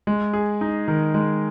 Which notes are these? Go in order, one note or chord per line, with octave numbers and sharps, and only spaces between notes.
G#3
G#4
D#4
D#3
G#3